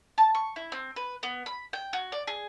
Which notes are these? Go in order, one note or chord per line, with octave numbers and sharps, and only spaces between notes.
A5
C#6
E4
C4
B4
B3
B5
G5
F#4
D5
G#4